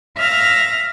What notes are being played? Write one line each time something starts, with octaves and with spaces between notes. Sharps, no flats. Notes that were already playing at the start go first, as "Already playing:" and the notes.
E5 F5 F6 A#6